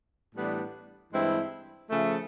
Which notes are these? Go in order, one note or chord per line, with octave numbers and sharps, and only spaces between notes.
A2 E3 G3 B3 D4
G2 E3 G#3 C4 E4
C#3 F3 A3